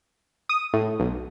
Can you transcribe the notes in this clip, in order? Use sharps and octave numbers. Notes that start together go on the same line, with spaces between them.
D#6
A2
B1